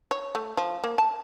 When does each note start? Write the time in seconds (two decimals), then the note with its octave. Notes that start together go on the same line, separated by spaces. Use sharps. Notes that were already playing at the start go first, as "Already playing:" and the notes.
0.11 C#5
0.35 A3
0.57 F3
0.84 A#3
0.98 A5